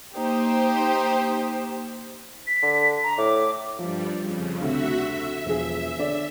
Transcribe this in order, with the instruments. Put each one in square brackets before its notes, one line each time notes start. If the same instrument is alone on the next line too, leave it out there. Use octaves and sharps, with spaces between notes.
[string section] A#3 D#4 G4 C5
[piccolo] B6
[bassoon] D3
[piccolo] A#5
[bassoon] A2 [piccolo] D6
[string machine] G2 G3 [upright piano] F3
[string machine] F2 C#3
[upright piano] D2 C3 [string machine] F#4 E5
[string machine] E5
[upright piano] E1 F3 G#4
D3 C#5 D5